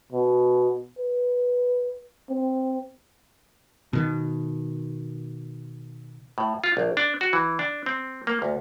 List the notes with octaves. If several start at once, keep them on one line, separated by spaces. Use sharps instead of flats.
B2
B4
C4
B2 D#3
A2
F4
A#1
D4
F#4
E3
D4
C4
A#3
D2